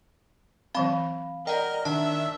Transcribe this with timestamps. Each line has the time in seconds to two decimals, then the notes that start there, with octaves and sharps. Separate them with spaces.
0.75 E3 F#3 C4 F5 B5
1.47 A#4 D5 D#5 F#5 G5
1.85 D#3 D4 E5 A5